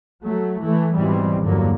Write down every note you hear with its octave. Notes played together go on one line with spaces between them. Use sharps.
F#3 A3
E3 A3
G#2 B2 E3 G3 C4
E2 G2 D3 F3 F#3 A#3